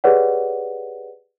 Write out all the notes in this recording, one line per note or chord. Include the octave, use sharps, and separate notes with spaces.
G4 G#4 B4 C#5 D5 F#5